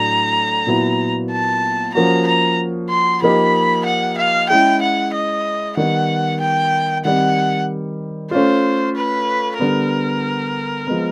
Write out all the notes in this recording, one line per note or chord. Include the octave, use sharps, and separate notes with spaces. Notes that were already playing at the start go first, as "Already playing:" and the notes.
Already playing: A2 F#3 A3 D4 A#5
A#2 F#3 B3 E4
A5
F3 A#3 C#4 F#4 A#5
A#5
C6
F3 A#3 D#4 G4 B5
F#5
F5
G#3 C#4 E4 G#4 G5
F#5
D#5
D#3 G3 B3 F#5
G5
D#3 G3 C4 F#5
A3 C#4 F4 C5
B4
D3 G3 B3 A#4
F3 G#3 B3